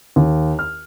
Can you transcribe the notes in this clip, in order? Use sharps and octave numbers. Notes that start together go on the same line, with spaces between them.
D#2
F6